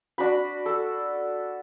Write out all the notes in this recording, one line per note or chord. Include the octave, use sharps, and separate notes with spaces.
D4 F#4 B5
A4